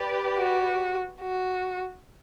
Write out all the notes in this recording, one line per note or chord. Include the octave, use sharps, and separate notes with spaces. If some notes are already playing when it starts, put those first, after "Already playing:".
Already playing: G4 B4 D5
F#4
F#4